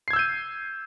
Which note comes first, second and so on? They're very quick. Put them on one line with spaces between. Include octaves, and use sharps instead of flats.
C7 G#6 E6 G6 D#7